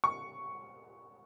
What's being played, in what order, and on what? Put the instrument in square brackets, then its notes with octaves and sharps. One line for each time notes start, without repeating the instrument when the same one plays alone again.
[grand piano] C#6